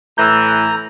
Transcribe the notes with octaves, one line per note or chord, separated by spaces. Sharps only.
A2 E3 A#5 E6 G6